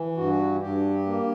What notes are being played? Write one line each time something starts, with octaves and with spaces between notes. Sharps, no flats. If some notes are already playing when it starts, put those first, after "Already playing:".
Already playing: E3
G2 F#4
G2 G4
A#3